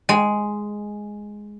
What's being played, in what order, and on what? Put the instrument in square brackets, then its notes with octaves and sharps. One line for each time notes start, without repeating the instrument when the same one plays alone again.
[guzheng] G#3